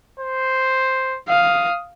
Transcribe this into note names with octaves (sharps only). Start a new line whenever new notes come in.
C5
F5 D#6